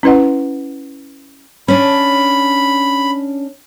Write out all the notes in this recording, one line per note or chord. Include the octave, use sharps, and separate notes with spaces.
C#4 E4 B4 D#5 F#5
C#4 D4 B5